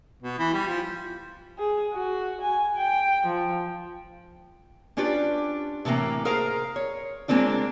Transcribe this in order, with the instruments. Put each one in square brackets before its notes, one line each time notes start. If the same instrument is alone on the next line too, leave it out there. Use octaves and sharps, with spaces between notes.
[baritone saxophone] B2
E3
G3
F3
[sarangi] G#4
F#4
G#5
G5
F3
[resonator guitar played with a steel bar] C#4 D4 F4 G4 B4
A2 C3 E3 A#3 A#5
G#4 A#4 C5 F5 A#5
C#5
G#3 A#3 C4 D4 F4